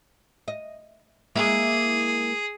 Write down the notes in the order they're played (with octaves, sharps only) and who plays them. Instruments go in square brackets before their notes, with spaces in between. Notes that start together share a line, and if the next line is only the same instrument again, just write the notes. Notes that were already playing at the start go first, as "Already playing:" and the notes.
[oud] D#5
[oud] G#3 A#3 E4 [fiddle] G#4